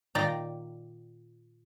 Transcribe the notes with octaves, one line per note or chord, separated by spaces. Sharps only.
A#2 D#3 D5 G5 A#5